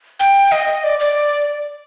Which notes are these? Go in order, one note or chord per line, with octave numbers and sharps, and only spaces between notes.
G5
D#5
D5
D5